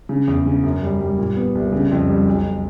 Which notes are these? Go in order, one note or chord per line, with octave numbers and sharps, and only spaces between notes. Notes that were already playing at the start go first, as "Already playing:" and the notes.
C#3
E2
C#3
F#2
G3
G3
A#2
B3
C2
C#3
F2
G3
B1